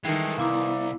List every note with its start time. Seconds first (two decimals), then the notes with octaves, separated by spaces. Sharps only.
0.05 D#3 E3 G3 G#3 A4
0.38 C2 B3 E4 F5 A#5 D6